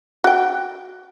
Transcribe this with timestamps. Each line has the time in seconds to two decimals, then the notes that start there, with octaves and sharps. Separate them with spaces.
0.24 F#4 G5